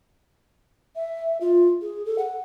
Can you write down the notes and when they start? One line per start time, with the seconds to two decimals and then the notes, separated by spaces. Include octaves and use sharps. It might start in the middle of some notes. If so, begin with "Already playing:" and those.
0.96 E5
1.41 F4
1.82 G#4
2.06 A4
2.18 F#5